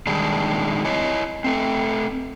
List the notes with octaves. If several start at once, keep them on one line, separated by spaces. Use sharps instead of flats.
D#3 G3 G#3 D4 D#4
E4 C#5 D#5
A3 C4